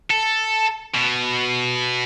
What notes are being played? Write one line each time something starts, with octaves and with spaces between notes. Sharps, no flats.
A4
B2